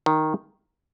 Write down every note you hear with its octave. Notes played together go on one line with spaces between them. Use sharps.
D#3